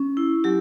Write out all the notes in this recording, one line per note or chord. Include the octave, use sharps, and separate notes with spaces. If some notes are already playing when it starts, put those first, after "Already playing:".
Already playing: C#4
E4
F#3 G4